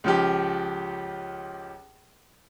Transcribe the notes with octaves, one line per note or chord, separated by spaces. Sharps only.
C#2 F3 G4